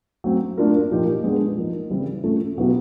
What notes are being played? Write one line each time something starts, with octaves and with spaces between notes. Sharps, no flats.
F#3 A3 C4
A3 D4 F4 A#4
A#2 F3 A#3 D#4 G4
G#3 B3 D4
F3 A#3 D#4
C#3 E3 G3 C4 E4
A3 C#4 F4 A4
B2 F#3 B3 E4 G4